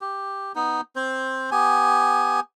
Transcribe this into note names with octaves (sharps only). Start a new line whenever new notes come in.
G4
B3 D#4
C4 C5
B3 G4 G#5